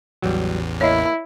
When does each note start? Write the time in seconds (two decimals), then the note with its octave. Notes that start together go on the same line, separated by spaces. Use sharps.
0.22 A1 E2 F#3 G3
0.81 A#3 E4 C#5 D#5